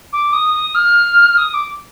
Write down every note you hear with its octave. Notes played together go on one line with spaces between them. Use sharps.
D6
D#6
D#6
F6
D#6
D6